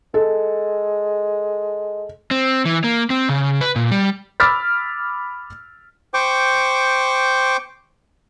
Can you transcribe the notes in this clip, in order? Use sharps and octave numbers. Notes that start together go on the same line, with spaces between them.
G#3 A4
C4
E3
A#3
C4
C#3
B4
A#2
G3
B5 D6 E6 F6 A6 B6
C5 G5 C#6 D6